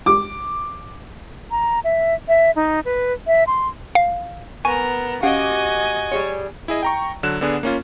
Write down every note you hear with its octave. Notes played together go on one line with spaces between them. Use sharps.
D6
A#5
E5
E5
D#4
B4
E5
C6
F5
B3 A#4 G#5 A#5 C#6
C#4 F#4 G4 D#5 F5 F#5 G#5 D#6
G3 G#4 C#5
E4 G#4 D#5
G5 A#5 C#6
D3 F#3 F#6 E7
D3 B3 D4 G#4
A#3 C#4 F4